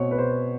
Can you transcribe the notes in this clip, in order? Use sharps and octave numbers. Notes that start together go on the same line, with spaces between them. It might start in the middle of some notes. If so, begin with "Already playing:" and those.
Already playing: B2 C4 C#5
B4
B2 C5